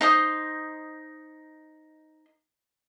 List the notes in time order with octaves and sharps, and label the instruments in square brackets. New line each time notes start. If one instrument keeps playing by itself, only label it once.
[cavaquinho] D#4 C5 D#6